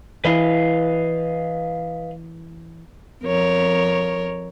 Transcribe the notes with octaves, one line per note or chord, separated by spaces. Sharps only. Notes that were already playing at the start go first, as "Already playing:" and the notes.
E3 E4 B4 D#5 F5
F2 A#4 C#5